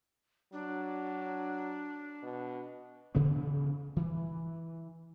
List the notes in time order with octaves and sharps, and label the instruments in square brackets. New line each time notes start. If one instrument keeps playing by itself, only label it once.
[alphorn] F#3 [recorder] D4
[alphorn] B2
[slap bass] D2 C#3 E3 B3
E3